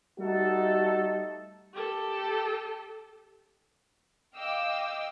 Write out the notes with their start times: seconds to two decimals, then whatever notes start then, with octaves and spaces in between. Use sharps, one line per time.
0.19 G3 A3 D#4 F#4 A4
1.74 G4 A4
4.35 D#5 F5 G5 D6 E6